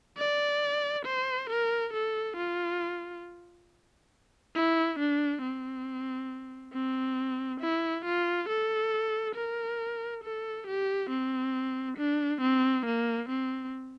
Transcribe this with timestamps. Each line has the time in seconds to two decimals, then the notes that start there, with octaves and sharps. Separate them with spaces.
0.18 D5
1.06 C5
1.50 A#4
1.93 A4
2.37 F4
4.55 E4
4.99 D4
5.42 C4
6.73 C4
7.61 E4
8.05 F4
8.49 A4
9.35 A#4
10.24 A4
10.67 G4
11.10 C4
11.98 D4
12.41 C4
12.86 A#3
13.29 C4